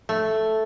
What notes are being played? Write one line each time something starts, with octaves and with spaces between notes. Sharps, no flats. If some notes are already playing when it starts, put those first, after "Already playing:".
A3